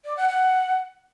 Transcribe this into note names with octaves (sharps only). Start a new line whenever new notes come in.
D5
F#5
F#5